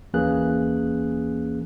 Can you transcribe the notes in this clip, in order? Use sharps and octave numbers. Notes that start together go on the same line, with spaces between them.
D#2 E3 A#3 C#4 G#4 F#6